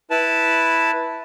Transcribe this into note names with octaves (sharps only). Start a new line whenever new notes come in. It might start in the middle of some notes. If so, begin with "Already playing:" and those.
E4 B4 A5